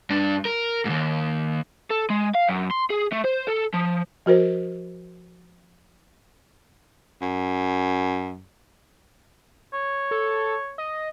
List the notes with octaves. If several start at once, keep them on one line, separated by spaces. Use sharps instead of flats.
G2 D4
A#4
D#2 G#2
A4
G#3
F5
F#2
C6
G#4
A3
C5
A4
F3
F3 F#4 A#4 C5
F#2
C#5
A4
D#5